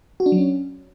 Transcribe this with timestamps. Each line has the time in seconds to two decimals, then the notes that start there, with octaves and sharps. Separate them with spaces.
0.20 F#4
0.26 D4
0.32 F#3
0.38 C#4